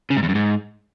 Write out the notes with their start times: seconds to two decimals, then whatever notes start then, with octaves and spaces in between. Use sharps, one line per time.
0.10 C#3
0.17 G#2
0.23 E2
0.29 F#2
0.35 G#2